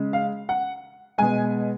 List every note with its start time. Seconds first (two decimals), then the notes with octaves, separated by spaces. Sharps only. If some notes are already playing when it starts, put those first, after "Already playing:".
Already playing: C#3 G#3
0.13 F5
0.49 F#5
1.18 B2 G#3 G#5